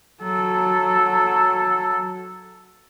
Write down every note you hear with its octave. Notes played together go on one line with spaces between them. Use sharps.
F#3 A4